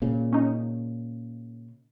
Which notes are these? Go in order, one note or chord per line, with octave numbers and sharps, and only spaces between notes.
A#2 C#3
C#4 D#4